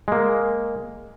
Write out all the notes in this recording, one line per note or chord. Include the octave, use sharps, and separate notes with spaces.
G#3 A#3